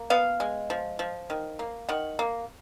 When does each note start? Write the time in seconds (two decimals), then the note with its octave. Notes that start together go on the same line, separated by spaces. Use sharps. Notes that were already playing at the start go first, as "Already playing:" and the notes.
Already playing: A#3
0.10 B3 F5
0.40 G#3
0.70 F3
0.99 F3
1.30 D#3
1.59 A#3
1.89 D#3 F#5
2.19 A#3